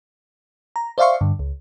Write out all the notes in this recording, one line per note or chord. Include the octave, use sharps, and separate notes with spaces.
A#5
C5 D5 E5 F5 C6 C#6
G2 D3
C#2